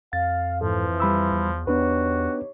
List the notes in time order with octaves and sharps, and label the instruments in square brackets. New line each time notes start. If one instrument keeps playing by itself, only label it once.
[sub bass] F2 [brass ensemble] F5 [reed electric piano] A6
[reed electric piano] G#2 A4 [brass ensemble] E3 [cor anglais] F3
[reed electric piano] G3 B5 E6
[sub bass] E2
[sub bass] E2 [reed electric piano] B3 D4 B4 [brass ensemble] D#4 G4 C#5 [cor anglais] F#4